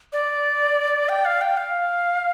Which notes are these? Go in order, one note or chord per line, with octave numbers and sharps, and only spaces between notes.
D5
G5
F5
G5
F5